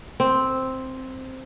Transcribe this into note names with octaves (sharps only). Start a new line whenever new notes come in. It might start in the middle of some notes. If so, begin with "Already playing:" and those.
C4